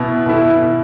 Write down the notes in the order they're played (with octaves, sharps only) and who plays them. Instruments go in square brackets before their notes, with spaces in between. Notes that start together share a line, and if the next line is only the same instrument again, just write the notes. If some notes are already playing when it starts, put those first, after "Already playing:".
Already playing: [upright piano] B2 B3 E4
B2 B3 E4